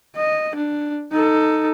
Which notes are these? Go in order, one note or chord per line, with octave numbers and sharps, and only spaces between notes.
D#5
D4
D#4 A4